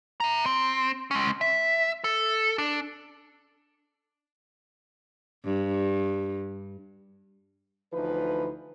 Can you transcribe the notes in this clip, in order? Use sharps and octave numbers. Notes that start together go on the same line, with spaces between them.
E5 A#5
C4
G#3 C#4
E5
A4
D4
G2
D2 E3 F3 D#4 B4